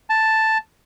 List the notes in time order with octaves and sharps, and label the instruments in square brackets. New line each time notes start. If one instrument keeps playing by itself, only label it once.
[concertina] A5